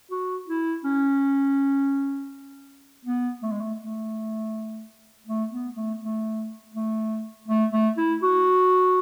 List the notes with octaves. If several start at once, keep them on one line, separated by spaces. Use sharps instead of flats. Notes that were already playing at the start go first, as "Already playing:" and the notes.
F#4
E4
C#4
B3
A3
G#3
A3
A3
A3
B3
A3
A3
A3
A3
A3
E4
F#4